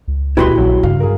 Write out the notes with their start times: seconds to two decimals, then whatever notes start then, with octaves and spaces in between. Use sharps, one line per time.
0.08 C#2
0.37 D#1 G#3 E4 F#4 G4 B4 C6
0.58 A#1 F#3
0.83 G2 C#3 F5
1.00 G#4 A#4